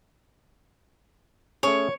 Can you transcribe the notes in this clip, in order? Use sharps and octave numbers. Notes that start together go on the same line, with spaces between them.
A3 C#4 G#4 C#5